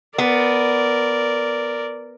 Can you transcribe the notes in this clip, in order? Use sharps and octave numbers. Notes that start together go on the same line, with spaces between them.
B3 A#4 D5